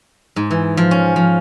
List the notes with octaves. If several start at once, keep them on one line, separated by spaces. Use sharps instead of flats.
G#2
E3
F3
C#4
F3